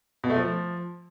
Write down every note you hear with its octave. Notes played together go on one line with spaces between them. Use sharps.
B2
A3
F3